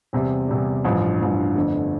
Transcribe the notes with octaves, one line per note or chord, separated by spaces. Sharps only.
E2 C3 G3
E2 C3 G3
A1 G2 F3
A1 G2 F3
G1 F2 D3 A3